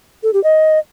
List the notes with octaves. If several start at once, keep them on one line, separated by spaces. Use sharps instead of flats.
A4
G4
D#5